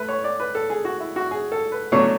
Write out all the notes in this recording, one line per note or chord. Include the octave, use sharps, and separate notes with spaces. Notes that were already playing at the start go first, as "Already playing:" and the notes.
Already playing: A3 A4 B4
C#5
D5
B4
A4
G#4
F#4
E4
F#4
G#4
A4
B4
B2 F#3 A3 D4 C#5